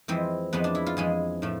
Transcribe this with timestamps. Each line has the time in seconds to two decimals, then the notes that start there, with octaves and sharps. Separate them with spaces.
0.08 F2 E3 G#3 C4
0.53 F2 E3 G#3 B3
0.64 D4
0.75 E4
0.86 F4
0.97 F2 E3 G#3 G#4
1.42 A2 F3 A3